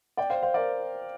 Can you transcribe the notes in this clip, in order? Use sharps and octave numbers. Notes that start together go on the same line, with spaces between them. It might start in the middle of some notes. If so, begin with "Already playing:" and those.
D5 G5
C5 F5
C5 F5
A#4 D5